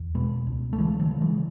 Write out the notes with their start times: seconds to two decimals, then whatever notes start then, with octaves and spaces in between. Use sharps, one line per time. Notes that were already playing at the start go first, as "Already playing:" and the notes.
Already playing: E2
0.15 B2 G#3 B3
0.47 C#2
0.73 A3
0.78 C#3 E3 G#3
0.99 D#3 F#3
1.11 C#3
1.21 E3 G#3